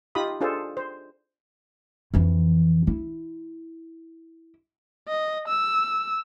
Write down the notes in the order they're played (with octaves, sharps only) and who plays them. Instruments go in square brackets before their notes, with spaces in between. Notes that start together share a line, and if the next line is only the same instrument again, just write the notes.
[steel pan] D#4 F4 G4 B5 D#6
D4 F4 G#4 A4 C5
C5
[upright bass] F2 E3
E4
[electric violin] D#5
E6